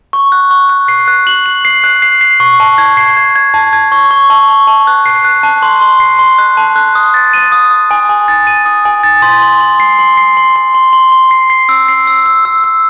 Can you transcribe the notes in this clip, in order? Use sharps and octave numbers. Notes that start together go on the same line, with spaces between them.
C#6
F#6
C#6
F#6
C7
F#6
F#7
F#7
C7
F#6
C7
C7
C#6
A5
G#6
C7
G#6
G#6
A5
G#6
C#6
C#6
A5
C#6
A5
F#6
C7
F#6
A5
C6
C6
C7
C6
F#6
A5
F#6
D#6
A6
D#7
D#6
D#6
G#5
G#5
A6
D#7
D#6
G#5
A6
C6
C6
C6
C7
C6
C7
C6
C6
C6
C6
C6
C7
C7
E6
C7
E6
E6
E6
E6